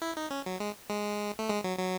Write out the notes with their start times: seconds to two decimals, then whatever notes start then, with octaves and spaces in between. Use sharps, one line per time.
0.02 E4
0.17 D#4
0.30 C#4
0.46 F#3
0.60 G#3
0.90 G#3
1.39 A3
1.49 G#3
1.64 F#3
1.79 F#3